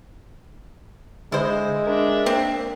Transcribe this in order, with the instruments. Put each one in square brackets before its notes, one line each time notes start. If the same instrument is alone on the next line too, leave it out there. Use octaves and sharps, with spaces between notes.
[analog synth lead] D3 [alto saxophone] G#3 [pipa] E4 C5
[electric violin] D4 E5 [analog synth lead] A#4
[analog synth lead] A#3 [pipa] C4